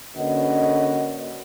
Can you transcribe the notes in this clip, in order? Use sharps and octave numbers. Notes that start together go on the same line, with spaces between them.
D3 A#3 C#4 F#4 B4 D#5